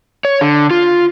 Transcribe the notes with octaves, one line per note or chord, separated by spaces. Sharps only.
C#5
D3
F4